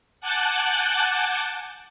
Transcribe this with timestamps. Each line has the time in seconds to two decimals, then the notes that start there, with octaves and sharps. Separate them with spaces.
0.21 F#5 G#5 A5 D6 F#6 G6